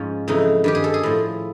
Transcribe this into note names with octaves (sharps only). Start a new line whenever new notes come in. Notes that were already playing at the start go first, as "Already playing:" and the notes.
Already playing: G#2 F3 C#4
F2 C#3 E3 D#4
G2 D#3 G4
G#4
A4
G#4
A2 F3